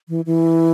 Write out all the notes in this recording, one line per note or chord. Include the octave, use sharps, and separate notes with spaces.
E3
E3